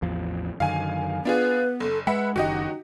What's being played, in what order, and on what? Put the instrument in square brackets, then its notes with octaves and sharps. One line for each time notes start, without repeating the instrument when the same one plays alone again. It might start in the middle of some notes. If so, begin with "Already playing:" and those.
[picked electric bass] A1 E2 F3
[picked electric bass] F#2 D3 D#3 [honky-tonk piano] F5 G#5
[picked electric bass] B3 [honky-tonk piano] D4 F4 G#4 [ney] B4
[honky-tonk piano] F#1 [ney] A4
[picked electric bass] G#3 [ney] B4 [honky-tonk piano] E5 F#5 B5
[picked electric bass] F#1 D#3 [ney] D#4 [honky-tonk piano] F#4 G4 D#5